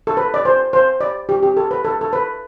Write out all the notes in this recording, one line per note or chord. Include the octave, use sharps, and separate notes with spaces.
A4
B4
D5
C5
C5
D5
G4
G4
A4
B4
A4
A4
B4